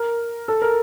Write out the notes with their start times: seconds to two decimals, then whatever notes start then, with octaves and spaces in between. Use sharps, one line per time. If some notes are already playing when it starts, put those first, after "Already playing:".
Already playing: A#4
0.48 A4
0.62 A#4